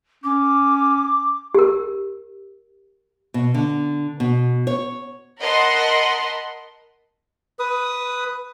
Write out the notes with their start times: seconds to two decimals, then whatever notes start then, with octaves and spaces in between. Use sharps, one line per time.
0.24 C#4 D6
1.54 G4 A#4
3.34 B2
3.54 D3
4.20 B2
4.67 C#5
5.41 A#4 D#5 F#5 A5 B5 C6
7.59 B4 D#6